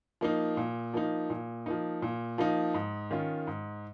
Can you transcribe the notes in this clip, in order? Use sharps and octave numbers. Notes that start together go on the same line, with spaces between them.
F3 A#3 D#4
A#2
F3 A#3 D#4
A#2
F3 A#3 D#4
A#2
F3 A#3 D#4
G#2
D#3 C#4 F4
G#2